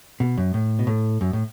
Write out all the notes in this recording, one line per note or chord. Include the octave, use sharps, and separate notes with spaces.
B2
F#2
A2
B2
A2
F#2
A2